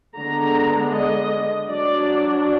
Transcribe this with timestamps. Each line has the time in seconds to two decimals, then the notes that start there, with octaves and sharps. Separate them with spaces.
0.18 D3 G#3 B3 D4 A#5
0.94 D#5
1.69 F#3 D4 D5